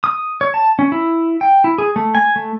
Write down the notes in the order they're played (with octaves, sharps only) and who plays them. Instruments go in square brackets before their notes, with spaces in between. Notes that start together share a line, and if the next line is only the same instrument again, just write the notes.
[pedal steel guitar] D#6
C#5
A5
C#4
E4
G5
E4
G#4
A3
G#5
A3